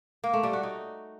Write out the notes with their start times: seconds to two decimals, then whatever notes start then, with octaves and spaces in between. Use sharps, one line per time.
0.24 A#3
0.33 A3
0.43 G3
0.53 F#4
0.63 D#4